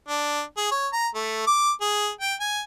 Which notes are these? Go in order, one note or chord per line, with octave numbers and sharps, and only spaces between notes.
D4
G#4
C#5
A#5
A3
D6
G#4
G5
G#5